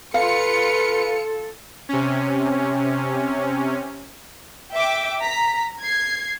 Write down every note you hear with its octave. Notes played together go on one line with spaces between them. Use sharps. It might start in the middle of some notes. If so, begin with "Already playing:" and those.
F4 A4 B4 F5 C#7
C3 C#4
E5 G5 D6
A#5 B6
G#6 C7